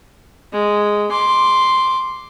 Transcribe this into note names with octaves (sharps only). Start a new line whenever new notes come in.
G#3
C6 D6